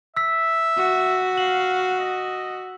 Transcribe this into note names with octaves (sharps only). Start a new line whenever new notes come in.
E5 E6 B6
F#4
F5 F#7
D#5